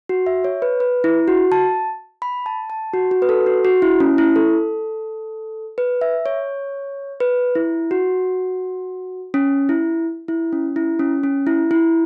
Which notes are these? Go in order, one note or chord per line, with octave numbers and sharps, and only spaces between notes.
F#4
E5
C#5
B4
B4
E4
F#4
A5
B5
A5
A5
F#4
F#4
B4
A4
F#4
F#4
E4
C#4
E4
A4
B4
E5
C#5
B4
E4
F#4
C#4
E4
E4
C#4
E4
C#4
C#4
E4
E4